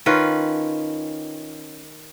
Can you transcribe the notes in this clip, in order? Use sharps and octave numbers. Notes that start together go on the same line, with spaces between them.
D#3 C#4 F4 B4